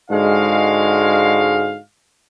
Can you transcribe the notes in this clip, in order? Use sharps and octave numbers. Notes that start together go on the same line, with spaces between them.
G#2 D3 G#3 F#4 F5